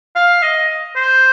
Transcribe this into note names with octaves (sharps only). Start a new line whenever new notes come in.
F5
D#5
C5